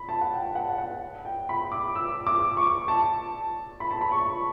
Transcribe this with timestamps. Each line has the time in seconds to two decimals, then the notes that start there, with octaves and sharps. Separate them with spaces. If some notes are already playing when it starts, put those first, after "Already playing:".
Already playing: B5
0.09 A5
0.21 F#5
0.33 G5
0.55 F#5
0.78 F#5
1.25 G5
1.49 B5
1.72 D6
1.95 E6
2.27 D6
2.57 C#6
2.88 A5
3.80 B5
3.91 A5
4.01 B5
4.12 C#6